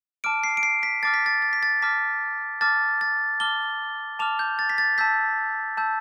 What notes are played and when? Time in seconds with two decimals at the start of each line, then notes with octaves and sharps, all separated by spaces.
0.24 A5 D6 F6 D7
0.44 C7
0.57 D7
0.63 C7
0.83 B6
1.03 A5 D6 F6 A6
1.14 B6
1.26 A6
1.42 A6
1.53 B6
1.63 A6
1.82 A5 D6 F6 B6
2.61 A5 D6 F6 A6
3.01 A6
3.40 A5 D6 F6 G7
4.19 A5 D6 F6 F7
4.39 G6
4.59 A6
4.70 B6
4.78 A6
4.98 A5 E6 G6 B6
5.77 A5 E6 G6